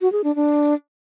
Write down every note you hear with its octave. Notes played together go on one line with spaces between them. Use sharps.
F#4
G#4
D4
D4